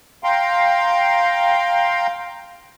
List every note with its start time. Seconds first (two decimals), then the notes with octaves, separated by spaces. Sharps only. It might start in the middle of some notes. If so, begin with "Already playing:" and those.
0.24 F5 G5 A#5 C6